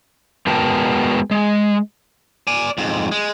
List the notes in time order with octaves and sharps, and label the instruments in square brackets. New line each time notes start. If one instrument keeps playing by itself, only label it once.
[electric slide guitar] G#3 B3 F#4 A#4 G5 A5
G#3
[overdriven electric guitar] D5 G#5
F2 G#2
G#3